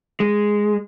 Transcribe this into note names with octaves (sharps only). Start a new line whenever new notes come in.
G#3